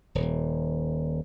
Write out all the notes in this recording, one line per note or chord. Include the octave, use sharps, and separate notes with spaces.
D#1